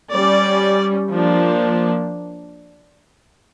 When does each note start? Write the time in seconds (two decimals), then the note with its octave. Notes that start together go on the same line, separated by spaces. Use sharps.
0.13 G3 C#4 D5
1.11 F3 A#3 D4